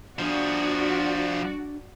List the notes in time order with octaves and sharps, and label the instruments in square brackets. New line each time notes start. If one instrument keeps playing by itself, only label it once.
[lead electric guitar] F3 G#4 [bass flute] D4 [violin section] F#4 D5